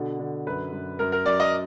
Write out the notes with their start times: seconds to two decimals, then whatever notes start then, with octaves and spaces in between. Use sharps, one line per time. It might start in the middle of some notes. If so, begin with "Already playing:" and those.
Already playing: B2 D3
0.19 D3
0.47 F#2 B4
0.73 F#2
0.99 F#2 A#4
1.12 A#4
1.25 F#2 D5
1.40 D#5